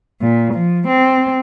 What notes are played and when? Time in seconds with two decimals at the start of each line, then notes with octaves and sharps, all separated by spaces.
0.21 A#2
0.54 F3
0.88 C4